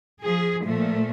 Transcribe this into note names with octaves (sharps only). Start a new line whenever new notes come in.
F3 G#4
A#2 F3 A3